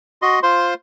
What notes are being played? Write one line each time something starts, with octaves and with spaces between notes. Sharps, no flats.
F#4 D#5 C6
F4 C5 C6